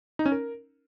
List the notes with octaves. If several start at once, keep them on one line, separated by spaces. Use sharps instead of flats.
D#4
C#4
A#4